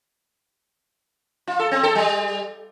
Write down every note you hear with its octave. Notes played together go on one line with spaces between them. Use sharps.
F4
A4
C4
A4
G3